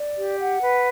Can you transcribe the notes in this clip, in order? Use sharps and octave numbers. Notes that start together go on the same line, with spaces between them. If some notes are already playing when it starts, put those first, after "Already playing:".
Already playing: D5
G4
F#5
B4